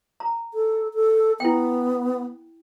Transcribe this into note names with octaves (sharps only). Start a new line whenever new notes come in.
A#5
A4
A4
B3 E4 G5